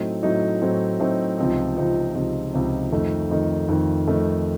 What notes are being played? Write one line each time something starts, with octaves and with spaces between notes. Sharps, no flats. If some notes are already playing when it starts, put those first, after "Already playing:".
Already playing: A2 F#3 A3 C4 D#4
A2 F#3 A3 C4 D#4
A2 F#3 A3 C4 D#4
A2 F#3 A3 C4 D#4
C#2 C3 F3 C4 D#4
C#2 C3 F3 C4 D#4
C#2 C3 F3 C4 D#4
C#2 C3 F3 C4 D#4
F2 D#3 A3 D#4
F2 D#3 A3 D#4
F2 D#3 A3 D#4
F2 D#3 A3 D#4